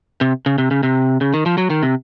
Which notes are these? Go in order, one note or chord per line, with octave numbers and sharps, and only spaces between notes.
C3
C#3
C3
C#3
C3
C#3
D#3
F3
F#3
D#3
C3